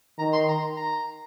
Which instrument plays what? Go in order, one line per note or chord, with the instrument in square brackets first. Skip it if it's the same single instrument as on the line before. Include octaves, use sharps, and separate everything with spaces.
[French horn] D#3 [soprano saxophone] A#5
[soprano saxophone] C6
A#5
A#5